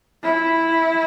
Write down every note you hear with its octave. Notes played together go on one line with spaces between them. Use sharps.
E4